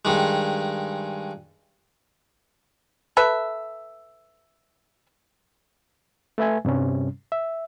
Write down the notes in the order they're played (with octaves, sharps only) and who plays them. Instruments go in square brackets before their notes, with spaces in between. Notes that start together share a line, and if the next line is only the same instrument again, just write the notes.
[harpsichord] G2 D#3 G#3
[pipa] A4 B4 E5
[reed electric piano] A3 B4 E5 G#5
G2 C3 G3 C#4
E5